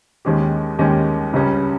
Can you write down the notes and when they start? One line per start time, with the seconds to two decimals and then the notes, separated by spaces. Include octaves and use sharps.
0.25 D#2 D#3 G#3 C#4 G4
0.79 D#2 D#3 G#3 C#4 G4
1.33 C#2 C#3 G3 C#4